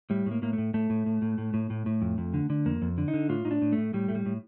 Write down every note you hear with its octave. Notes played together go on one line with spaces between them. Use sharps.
A2 G3
A2 A#3
A2 A#3
A3
A2
A2 A3
A2
A2
A2
A2
A2
A2
A2
F2
F2
D3
D3
F2 A#3
F2
D3
D#4
D3
A2 F4
A2 D#4
D4
A2
A2 A3
A2 G3
A2 A3
G3
A2